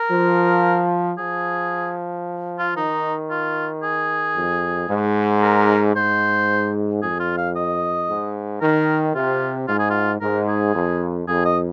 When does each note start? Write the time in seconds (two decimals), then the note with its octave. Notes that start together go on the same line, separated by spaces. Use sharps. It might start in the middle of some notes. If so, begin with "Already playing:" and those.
Already playing: A#4
0.11 F3
1.17 F3 G#4
2.59 F4
2.76 D#3 D#4
3.30 F4
3.83 G#4
4.36 F2
4.90 G#2
5.43 A#4
5.96 G#2 C5
7.02 F2 G#4
7.20 F4
7.37 F5
7.56 D#5
8.09 G#2
8.61 D#3 A#4
9.15 C3 F4
9.68 G#2 F4
9.79 G#4
9.90 F4
10.21 G#2 A#4
10.48 G#4
10.75 F2
11.27 F2 G#4
11.45 D#5